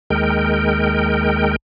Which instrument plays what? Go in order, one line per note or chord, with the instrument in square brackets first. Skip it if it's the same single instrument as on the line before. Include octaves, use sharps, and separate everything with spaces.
[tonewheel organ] D#2 G#3 A#4 G5